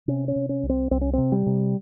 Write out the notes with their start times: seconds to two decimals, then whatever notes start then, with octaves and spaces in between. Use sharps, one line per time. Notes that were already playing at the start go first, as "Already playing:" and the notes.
0.08 C3 C#4
0.28 C#4
0.36 C3
0.49 C#4
0.63 C2
0.69 C4
0.91 C2 C4
1.01 C#4
1.13 C3 C4
1.32 G3
1.46 C3